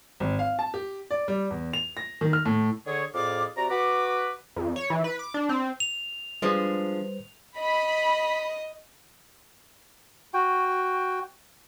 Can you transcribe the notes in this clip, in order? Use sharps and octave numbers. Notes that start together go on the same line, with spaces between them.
G#1
F5
A5
G4
D5
G3
E2
F7
A#6
D#3
F6
A2
D3 G#4 C#5
F2 A2 G#4 D5 F5 D6
C3 F#4 D5 A#5
F#4 B4 D6
F2
C#5
E3
B4
D6
D4
C4
F7
F3 G3 G#3 D4 B4 C5
D#5 B5
F#4 G5